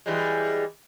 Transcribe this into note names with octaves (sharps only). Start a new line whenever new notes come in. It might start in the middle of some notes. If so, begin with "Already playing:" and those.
E3 G3 G#3